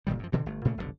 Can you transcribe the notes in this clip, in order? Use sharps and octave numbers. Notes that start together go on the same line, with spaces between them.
F#1 A#2 D#3 G3
F#2 F3
G2 B2 D3 E3
G1 A3
A#2 C#3 A3 A#3
F1 B1 A2 D3